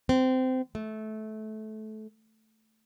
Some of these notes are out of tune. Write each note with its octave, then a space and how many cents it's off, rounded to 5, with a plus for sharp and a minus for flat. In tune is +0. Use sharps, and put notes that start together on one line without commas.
C4 -20
A3 -20